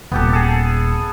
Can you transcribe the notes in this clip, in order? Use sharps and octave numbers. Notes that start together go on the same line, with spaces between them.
D#1 B3 G4 A4
G#4 A4